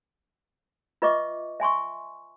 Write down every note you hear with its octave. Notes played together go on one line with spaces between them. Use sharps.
F4 B4 D#5 E5 C#6 D6
E5 G#5 C6 C#6